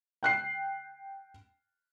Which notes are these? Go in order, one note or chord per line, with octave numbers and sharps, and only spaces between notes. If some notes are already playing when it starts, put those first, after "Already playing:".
G5 F#6 C7